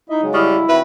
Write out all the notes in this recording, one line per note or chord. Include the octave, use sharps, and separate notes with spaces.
D#4 E4 D#5 E5
C#3 F#3 G#3
G3 E4 C#6 D#6 F6
D#3 C4 F#4 B4 E5